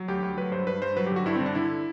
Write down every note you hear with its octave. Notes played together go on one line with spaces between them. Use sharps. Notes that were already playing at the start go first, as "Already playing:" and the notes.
Already playing: F#3
D2 G4
D2
F#3 B4
G2 C5
G2 B4
G2 C5
F#3 B4
G4
D3
F#4
G2 E4
C4
D3
D4
D3 E4